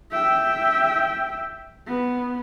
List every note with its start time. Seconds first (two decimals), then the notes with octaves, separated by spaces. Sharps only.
0.12 E5 G5
1.87 B3